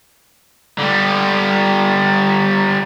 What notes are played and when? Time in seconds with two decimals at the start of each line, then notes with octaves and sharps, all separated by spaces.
0.79 D3 G3